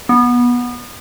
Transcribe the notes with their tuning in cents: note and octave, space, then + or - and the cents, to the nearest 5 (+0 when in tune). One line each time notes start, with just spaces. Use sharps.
B3 -20